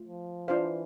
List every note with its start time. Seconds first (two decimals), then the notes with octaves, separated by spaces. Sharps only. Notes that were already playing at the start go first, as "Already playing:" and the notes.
Already playing: A3 F4
0.08 F3
0.48 E3 D4 F4 C5 F5